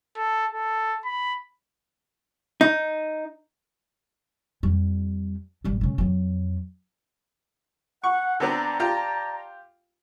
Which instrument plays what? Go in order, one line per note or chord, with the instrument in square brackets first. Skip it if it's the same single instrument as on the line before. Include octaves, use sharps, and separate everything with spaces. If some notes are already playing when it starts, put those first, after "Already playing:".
[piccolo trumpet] A4
A4
B5
[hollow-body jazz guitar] D#4
[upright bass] F2 G3
A1 G3
C#3 G#3
F2 F#3
[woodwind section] F#5 [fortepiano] C#6
[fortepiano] D3 B3 C4 [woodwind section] D5 A5 A#5
[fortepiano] F4 G4